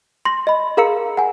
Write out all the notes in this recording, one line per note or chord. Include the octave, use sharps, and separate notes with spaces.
C6 A#6
D#5 B5
G#4 A#4 F5 A#5 E6 C#7
F#5 G#5